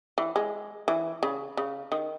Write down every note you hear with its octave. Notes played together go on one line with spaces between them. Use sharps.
E3
G#3
E3
C#3
C#3
D#3